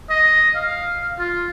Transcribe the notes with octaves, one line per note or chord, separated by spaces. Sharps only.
D#5
F5
F4